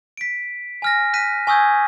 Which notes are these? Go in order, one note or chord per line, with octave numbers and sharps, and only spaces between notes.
B6 D7
G#5 F6 A#6
F#6 B6 D#7
G#5 C#6 D#6 E6 G6 G#6